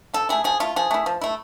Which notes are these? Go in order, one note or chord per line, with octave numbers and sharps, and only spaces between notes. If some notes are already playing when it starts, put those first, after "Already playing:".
F3 A4
A3 E4 G#4
F3 G#4
A3 E4 F4
F3 G#4
A3 E4
F3
A3 E4